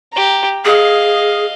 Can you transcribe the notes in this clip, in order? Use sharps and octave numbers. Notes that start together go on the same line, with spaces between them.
G4 A#5
G#4 D#5 F5